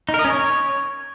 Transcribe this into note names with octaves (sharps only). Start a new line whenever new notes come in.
D#4
A#4
D#5
C#4
C#5